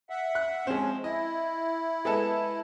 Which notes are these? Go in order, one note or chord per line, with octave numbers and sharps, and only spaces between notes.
E5 F#5
F#6
F3 G#3 C4 C#4
E4 D#5
G#3 B3 A4